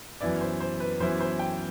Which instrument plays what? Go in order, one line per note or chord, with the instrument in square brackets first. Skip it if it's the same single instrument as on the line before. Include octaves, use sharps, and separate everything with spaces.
[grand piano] F#2 E3 B3 E4 [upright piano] D5
[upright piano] C5
C5
B4
[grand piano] F#2 E3 B3 E4 [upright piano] C5
[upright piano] C5
G5